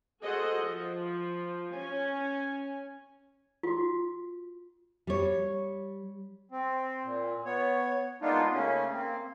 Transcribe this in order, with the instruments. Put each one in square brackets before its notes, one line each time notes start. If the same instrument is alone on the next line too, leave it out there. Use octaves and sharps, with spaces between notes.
[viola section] F#4 G#4 A4 C5 D#5 F#5
F3
C#4 G#5
[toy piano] F4 F#4
[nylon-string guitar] G3 C#5
[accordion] C4
A#2
B3 C#5
G#3 A#3 B3 D4 D#4 F4
C#3 A3 A#3 C#4
A#3 C4